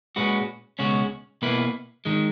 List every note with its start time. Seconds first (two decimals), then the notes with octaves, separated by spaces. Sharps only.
0.16 A#2 G#3 C#4 F#4 B4
0.79 C#2 B2 G#3 C#4 F#4
1.42 B2 A#3 E4 B4
2.05 D#3 G#3